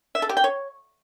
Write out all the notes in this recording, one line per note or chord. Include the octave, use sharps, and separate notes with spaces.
E5
A4
G4
G5
C#5